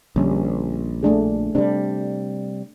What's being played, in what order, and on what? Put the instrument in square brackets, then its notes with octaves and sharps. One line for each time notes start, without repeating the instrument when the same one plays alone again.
[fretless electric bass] A#1 [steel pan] D3 G3 C#4
[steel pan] A3 D4 G#4
[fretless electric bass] C3 G3 [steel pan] D4